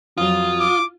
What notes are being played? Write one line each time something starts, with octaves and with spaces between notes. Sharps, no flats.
F2 F#3 F4 D#6
D6